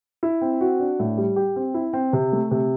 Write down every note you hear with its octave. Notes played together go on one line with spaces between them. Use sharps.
E4
C4
F#4
D4
A2
G3
G4
C4
E4
C4
C3
A3
C3